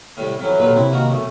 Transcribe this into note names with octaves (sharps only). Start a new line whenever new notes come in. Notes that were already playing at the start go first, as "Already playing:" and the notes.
C2 A2
F2 E3 F#3
D#2 A#2 A3 B4
C3 E4
D#3 A#3 F#4
B1 A3